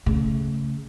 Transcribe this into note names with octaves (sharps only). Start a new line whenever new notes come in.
C#3 A3